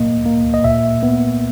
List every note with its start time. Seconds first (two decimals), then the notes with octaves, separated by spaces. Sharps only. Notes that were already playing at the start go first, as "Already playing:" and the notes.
Already playing: A#2 F#3 A#3 D#5
0.26 A#3
0.54 D#5
0.64 A#2 E5
1.03 B3